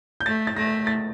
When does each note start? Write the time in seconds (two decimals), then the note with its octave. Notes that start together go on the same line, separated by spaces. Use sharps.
0.20 G6
0.26 A3 A6
0.47 A6
0.56 A3 A#6
0.87 A6